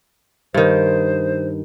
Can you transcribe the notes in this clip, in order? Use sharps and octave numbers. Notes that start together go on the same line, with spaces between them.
G2 D#3 C5